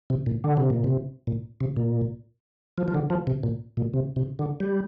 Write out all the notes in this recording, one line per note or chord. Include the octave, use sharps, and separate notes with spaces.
C3
A#2
D3
C3
A#2
C3
A#2
C3
A#2
F3
F3
D3
F3
C3
A#2
A#2
C3
C3
D3
G3